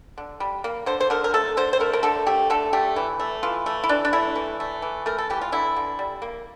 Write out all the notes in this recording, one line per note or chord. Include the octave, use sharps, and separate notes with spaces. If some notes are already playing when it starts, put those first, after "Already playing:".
D3
G3
A#3
D3 C5
C5
D3 A#4
A#4
A3 A4
D3 C5
C5
A3 A#4
A#4
D3 A4
A3 G4
D3 A4
A3 G4
E3
A3
E3 F4
A3
E4
E3 D4
D4
A3 E4
E3
A3
E3
A3 A#4
A4
E3 G4
F4
D3 E4
D3
G3
A#3